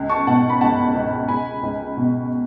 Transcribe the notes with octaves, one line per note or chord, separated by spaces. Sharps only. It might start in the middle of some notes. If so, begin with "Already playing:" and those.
Already playing: C#2
A5 C#6
B2 F#5 A5
B5
C#2 F#5 A5
C#2
C#2 G#5 B5
C#2
B2